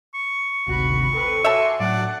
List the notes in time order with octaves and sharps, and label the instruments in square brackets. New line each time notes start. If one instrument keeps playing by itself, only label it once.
[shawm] C#6
[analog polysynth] G#1 D2 C3 [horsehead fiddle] F#4 B5
[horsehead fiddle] C4 B4 [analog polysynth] A4
[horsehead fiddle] F#4 G#5 [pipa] A4 C#5 E5 [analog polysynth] C6 D6 C#7
[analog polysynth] A2 F#3 [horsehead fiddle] D4 F#5 [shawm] D5